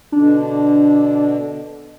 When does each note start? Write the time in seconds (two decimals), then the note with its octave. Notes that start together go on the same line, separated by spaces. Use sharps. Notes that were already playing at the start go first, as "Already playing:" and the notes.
0.12 B2 D3 D4